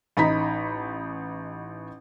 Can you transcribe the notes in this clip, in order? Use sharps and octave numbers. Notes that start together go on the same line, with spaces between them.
A1 D#4 A#5 B5 B6